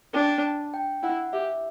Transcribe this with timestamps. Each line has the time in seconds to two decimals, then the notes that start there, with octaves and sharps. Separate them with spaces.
0.13 D4 G5
0.43 A5
0.74 G5
1.03 E4 F#5
1.32 G4 E5